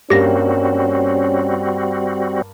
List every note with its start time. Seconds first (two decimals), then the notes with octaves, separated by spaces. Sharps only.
0.10 G2 G3 A#3 C4 C#4 F#4 G4 A#6